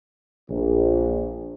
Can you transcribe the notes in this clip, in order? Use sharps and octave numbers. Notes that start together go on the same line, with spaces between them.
A#1